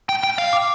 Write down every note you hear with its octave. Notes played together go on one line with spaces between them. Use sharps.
G5
G5
F5
D6